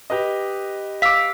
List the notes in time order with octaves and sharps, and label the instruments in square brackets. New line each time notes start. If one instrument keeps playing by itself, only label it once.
[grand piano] G4 B4 D#5
[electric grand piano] F5 D6 [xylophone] E6 B6